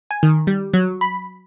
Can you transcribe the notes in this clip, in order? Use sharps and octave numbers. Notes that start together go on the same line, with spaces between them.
G#5
D#3
G3
F#3
B5